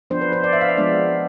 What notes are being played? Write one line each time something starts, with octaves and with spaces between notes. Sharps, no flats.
F3 B3 D4 C5
B4
C5
D5
E5
F5
E5
F3 G#3 B3 D4 D5